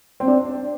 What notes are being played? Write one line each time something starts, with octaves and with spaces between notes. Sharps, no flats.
C4
D4